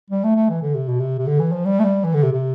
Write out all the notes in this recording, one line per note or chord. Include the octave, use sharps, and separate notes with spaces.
G3
A3
A3
E3
D3
C3
B2
C3
C3
D3
E3
F3
G3
A3
G3
E3
D3
C3
C3